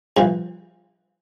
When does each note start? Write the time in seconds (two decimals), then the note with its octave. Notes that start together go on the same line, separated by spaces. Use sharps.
0.17 G2 E3 F3